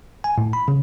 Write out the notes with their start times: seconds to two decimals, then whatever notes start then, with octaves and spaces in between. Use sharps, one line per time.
0.24 G#5
0.38 A2
0.53 B5
0.68 C#3